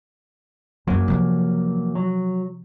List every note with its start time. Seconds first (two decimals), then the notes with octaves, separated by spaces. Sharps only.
0.87 F#2 E3 F#3 A#3 C#4
1.08 C3 F3
1.95 F#3